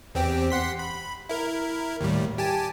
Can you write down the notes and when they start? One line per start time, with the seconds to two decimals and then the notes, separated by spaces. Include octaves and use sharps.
0.15 E2 C4 G4
0.50 F#5 C6 B6
0.79 B5
1.29 E4 A#4
2.01 D#2 A2 G3
2.38 G4 G#5 A5